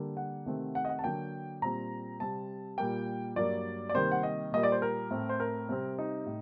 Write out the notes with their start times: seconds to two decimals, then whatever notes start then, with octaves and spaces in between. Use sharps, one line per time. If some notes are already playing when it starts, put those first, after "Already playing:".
Already playing: D3 G3 A#3
0.17 F#5
0.46 C3 D#3 A3 C4
0.75 F#5
0.85 D#5
0.89 F#5
0.99 A5
1.03 D3 F#3 A#3 G5
1.62 A#2 G3 C4 A#5
2.20 C3 G3 C4 A5
2.78 A#2 G3 A#3 G5
3.36 G2 F#3 A#3 D5
3.89 D5
3.94 C3 D#3 G3 A#3 C5
4.12 F#5
4.23 D#5
4.52 A#2 G3 A#3 D#5
4.63 D5
4.72 C5
4.82 A#4
5.11 A2 A3 C4
5.29 C5
5.40 A#4
5.69 C3 G3 C4
5.98 D#4
6.26 A2